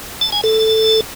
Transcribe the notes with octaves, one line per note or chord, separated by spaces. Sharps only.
A5
G#5
A4